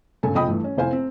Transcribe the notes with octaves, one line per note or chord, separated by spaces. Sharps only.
G2 C#3 A4 G#5
F1 F3 D#5 G5 B5 D#6
G2 E3 A3
C#4
F1 E4 C5 F5 G#5
C4